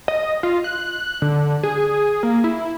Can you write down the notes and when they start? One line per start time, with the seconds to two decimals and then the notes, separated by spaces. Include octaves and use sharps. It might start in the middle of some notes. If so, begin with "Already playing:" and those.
0.08 D#5
0.43 F4
0.64 F#6
1.22 D3
1.63 G#4
2.23 A#3
2.44 E4